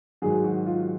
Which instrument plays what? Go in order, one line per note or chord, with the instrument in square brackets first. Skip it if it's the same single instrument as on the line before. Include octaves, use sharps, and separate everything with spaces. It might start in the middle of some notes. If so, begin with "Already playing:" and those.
[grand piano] G#2 D#3 F#3 G#4
F#4
F4